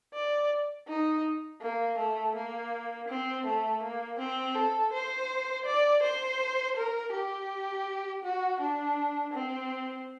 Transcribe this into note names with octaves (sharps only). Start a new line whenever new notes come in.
D5
D#4
A#3
A3
A#3
C4
A3
A#3
C4
A4
C5
D5
C5
A#4
G4
F#4
D4
C4